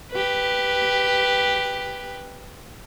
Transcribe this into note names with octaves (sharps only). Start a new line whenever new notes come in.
G4 B4